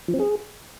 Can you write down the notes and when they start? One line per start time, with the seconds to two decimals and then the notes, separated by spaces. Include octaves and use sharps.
0.08 F3
0.14 C4
0.19 G#4